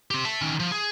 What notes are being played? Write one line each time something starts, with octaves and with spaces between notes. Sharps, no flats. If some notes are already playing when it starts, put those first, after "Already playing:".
C4 G4
E5 A5
D#3 C#4
F3
G#4